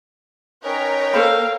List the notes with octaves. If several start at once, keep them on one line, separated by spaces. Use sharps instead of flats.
C#4 D#4 A#4 B4 C#5 G5
A#3 A4 C5 F5 B5